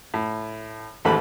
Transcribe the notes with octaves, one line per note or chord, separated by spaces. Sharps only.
A2
A1 D#2 G#2 A3 B5